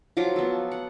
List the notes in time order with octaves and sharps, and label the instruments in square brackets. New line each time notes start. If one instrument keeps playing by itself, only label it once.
[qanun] F3 F#3 F4 D6
B3 A4
F#5